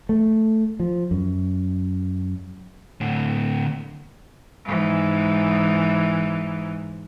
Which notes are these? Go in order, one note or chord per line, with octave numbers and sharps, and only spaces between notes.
A3
F3
F#2
A2 D3
G#2 E3